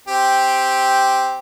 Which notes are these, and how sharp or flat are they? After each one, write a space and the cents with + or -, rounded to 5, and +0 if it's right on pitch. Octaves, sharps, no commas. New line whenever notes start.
C4 +0 G4 +0